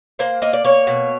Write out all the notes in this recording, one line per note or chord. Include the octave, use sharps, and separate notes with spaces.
A#3 C5
A#3 D#5
D5
A#3 C#5
B2